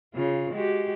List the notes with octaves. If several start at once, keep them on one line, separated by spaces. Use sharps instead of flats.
C#3 F4
G#3 F#4 G4